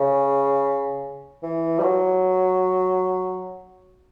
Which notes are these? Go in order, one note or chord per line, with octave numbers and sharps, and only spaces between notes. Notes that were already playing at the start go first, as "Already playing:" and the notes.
Already playing: C#3
E3
G3
F#3